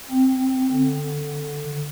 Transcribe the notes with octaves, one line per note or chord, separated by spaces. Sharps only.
C4
D3